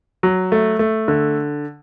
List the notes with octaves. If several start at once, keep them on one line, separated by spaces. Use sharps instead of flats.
F#3
A3
A3
D3